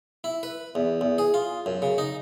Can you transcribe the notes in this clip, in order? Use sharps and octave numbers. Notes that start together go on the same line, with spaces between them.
E4
B4
E2
E2
G#4
F4
F#2
C#3
D#4